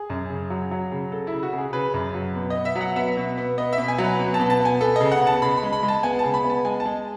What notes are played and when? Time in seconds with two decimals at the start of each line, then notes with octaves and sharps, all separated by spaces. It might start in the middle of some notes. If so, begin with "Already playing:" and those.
Already playing: G#4
0.10 F#2
0.30 C#3
0.50 F#3
0.71 F#3
0.92 C#3
1.12 C#3 A4
1.27 E4
1.33 C#3
1.43 F#4
1.53 C#3
1.58 G#4
1.73 C#3 B4
1.94 F#2
2.14 F#3
2.35 B2
2.50 B3 D#5
2.65 E5
2.76 F#3
2.81 F#5
2.96 B3 E5
3.17 B2
3.38 B3
3.58 B3 D#5
3.73 E5
3.78 B2
3.88 G#5
3.98 F#3
4.04 B4
4.19 B2
4.34 A5
4.40 B2
4.50 A5
4.60 B3
4.65 G#5
4.81 B3 A4
4.96 C#3 D#5
5.12 F#5
5.21 B3
5.27 A5
5.42 C#3 B5
5.57 B5
5.63 G#3
5.73 B5
5.83 G#3
5.88 A5
6.03 B3 G#5
6.19 A5
6.24 C#3
6.34 B5
6.44 B3
6.50 A5
6.65 G#3 G#5
6.80 A5
6.85 G#3